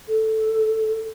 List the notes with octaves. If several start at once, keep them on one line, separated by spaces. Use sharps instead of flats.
A4